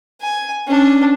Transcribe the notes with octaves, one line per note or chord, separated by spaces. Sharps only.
G#5
C#4 D4